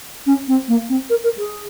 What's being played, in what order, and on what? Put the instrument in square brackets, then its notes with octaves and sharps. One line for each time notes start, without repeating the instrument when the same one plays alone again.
[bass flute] C#4
C4
A#3
C4
A#4
A#4
G#4